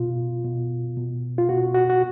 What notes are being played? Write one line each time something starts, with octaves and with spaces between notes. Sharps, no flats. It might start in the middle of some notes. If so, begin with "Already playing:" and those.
Already playing: B2 F4
B2
B2
F4
B2 F#4
F#4
F#4